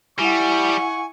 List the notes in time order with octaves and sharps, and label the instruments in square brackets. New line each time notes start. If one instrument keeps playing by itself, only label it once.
[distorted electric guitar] G3 [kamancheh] E4 F#5 [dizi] G#5 [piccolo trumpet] C#6